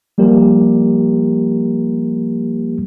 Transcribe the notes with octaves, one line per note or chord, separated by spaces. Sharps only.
F3 G3 A#3 G4 A#4